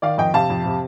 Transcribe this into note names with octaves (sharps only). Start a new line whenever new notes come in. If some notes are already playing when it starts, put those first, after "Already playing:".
D#3 D5 F5
F2 D#5 G5
C3 F5 A5
F2
C3